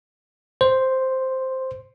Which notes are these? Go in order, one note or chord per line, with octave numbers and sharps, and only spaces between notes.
C5